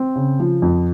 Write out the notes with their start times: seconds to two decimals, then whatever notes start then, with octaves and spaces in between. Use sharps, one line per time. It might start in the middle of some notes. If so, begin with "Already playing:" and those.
Already playing: C4
0.16 C#3
0.40 F3
0.62 F2